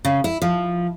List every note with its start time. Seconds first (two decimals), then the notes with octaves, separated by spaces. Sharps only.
0.05 C#3
0.24 E4
0.42 F3